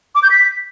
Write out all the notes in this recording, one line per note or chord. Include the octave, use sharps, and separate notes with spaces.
D6
G6
B6